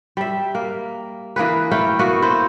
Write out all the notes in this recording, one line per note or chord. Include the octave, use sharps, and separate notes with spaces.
G3 E5
A#3
E3 A#3 G#4 B4
A3 E4 F5 G5
A#3 B3 F#4
E4 C5